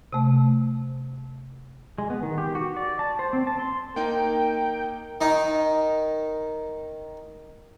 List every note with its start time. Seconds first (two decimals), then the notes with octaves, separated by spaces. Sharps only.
0.13 C3 A3
1.98 G#3
2.10 B3
2.23 D#3
2.38 G4
2.55 F#4
2.76 D5
2.99 A5
3.19 C5
3.33 C4
3.47 A5
3.59 C6
3.96 A#3 D#4 A#4 G5
5.21 D#3 D#4